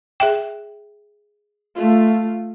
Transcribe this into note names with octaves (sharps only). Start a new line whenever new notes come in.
G#4 E5 G5
A3 F4